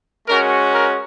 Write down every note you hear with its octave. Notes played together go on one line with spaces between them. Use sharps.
G#3 C#4 F#4 A#4
A#4